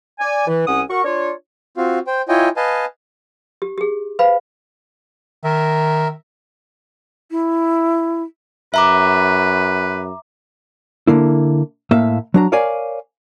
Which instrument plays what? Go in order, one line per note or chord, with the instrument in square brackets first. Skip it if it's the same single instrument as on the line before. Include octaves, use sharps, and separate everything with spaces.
[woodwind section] D5 G#5
E3
C2 C#4 F#5 D#6
F#4 A#4 F#5 C#6
D4 F4 C#5
[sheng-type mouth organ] C4 F4 F#4 F5
C5 G5
E4 F4 C#5 D#5 G5 G#5
B4 D#5 F5 G#5 A5
[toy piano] G4
G4 G#4
B4 C5 F5 B5
[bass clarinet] D#3 [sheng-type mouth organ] A#4 E5
[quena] E4
[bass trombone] F#2 [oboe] B4 [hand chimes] E5 A#5 D6
[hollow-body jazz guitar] D3 A#3 E4
A2 A#3 E5 F5
F#3 D4 A#5
A#4 C#5 D5 F5 G#5